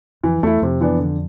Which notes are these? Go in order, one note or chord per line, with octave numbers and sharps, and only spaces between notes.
F2 E3
E2 A3 E4
F2 C3
E3 B3 D4
D3